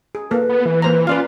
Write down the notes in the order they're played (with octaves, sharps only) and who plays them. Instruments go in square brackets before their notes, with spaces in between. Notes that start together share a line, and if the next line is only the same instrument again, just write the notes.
[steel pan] G#4
[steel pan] A#3 A4 [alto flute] B4
[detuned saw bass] B3
E3
[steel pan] A#3 C5 A#5 [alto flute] B4
[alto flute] C#4 [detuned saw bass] F4 [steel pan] B4 D5 F5